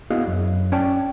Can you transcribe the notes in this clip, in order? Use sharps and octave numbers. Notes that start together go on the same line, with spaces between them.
B3 E4 F#4 G#4 D#5 F5
F#2
C#4 D5 G5 A5